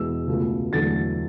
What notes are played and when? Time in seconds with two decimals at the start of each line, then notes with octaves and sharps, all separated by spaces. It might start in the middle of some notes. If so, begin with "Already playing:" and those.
Already playing: E2 B2 G#3 E6
0.27 C#2 B2 A3
0.72 E2 D3 F#3 A3 A6